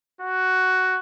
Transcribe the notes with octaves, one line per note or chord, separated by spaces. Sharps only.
F#4